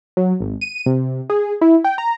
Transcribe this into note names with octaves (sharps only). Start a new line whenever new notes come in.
F#3
G#1
D#7
C3
G#4
E4
G5
A#5